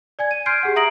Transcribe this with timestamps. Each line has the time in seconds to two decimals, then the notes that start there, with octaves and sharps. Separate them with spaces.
0.19 D5 G#5 G#6
0.31 D#7
0.46 C6 F6 G6 G#6 C7 D7
0.63 G4 G#4 F#5
0.76 E5 A#5 D#6 A#6 D7 F#7